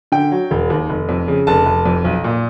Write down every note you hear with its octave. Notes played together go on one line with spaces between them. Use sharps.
D3 G5
F#3
E1
D#2
F1
F2
C#3
F1 A5
F1
F2
B1
A#2